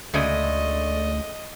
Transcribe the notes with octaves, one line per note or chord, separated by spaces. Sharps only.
D2 C#3 G#3 A3 D5 D#5